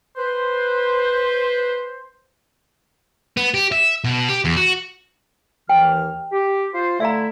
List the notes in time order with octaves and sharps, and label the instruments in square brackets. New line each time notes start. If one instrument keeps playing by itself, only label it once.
[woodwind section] B4 C5
[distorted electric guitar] B3
G4
E5
B2
G4
E2
F#4
[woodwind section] D#2 E3 F6 [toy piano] G5
[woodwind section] G4
F4 C5
[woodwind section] D3 A3 E4 [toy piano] E5 F5 A#5